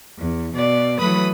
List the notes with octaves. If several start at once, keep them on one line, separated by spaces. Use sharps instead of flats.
E2
B2 D5
E3 F#3 A3 B4 B5 D#6